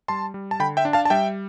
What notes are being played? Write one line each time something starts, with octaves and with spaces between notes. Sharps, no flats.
G3 A5 C6
G3
A5
D3 G5 B5
E5 G5
D4
F5 A5
A5
G3 E5 G5